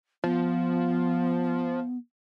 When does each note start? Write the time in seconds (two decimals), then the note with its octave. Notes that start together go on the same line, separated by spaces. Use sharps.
0.24 F3 B3